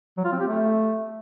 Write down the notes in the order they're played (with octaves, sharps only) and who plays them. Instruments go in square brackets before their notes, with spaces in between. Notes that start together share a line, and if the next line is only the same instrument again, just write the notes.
[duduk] F#3
F4
C4
G4
A3